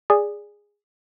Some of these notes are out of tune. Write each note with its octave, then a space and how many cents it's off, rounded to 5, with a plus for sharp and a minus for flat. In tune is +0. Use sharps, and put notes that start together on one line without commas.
G#4 -10 D5 +0